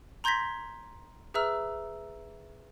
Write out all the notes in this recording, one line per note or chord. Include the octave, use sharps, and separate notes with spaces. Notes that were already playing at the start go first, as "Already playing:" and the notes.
A#5 C6 G6 G#6 A#6 B6
G#4 B4 E5 A#5 E6 F6